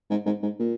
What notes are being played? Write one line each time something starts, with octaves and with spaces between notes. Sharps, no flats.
G#2
G#2
G#2
A#2